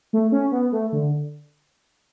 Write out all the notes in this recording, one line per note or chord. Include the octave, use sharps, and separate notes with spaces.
A3
C#4
B3
A3
D3